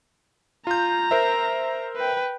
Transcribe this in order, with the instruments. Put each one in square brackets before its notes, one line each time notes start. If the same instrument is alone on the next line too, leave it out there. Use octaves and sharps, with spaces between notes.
[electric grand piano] F4 G6 [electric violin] A#5
[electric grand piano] A#4 C5 E5
[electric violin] B4 G5